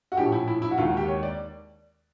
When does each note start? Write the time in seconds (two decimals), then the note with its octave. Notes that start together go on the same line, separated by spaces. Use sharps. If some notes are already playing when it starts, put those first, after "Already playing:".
0.12 F#4
0.17 A#1 A2 F3 G4
0.32 E4
0.47 E4
0.62 E4
0.71 F#4
0.78 D#2 D#3 G#3 F4
0.88 F#4
0.97 G4
1.08 C#5
1.23 D5